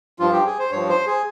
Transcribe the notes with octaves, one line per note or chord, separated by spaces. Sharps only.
G2 F3 F4
G4
G#4
C5
G2 F3 C#5
C5
G#4